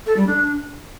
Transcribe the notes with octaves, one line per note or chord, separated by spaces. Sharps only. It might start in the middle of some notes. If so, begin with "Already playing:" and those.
A4
G3
D4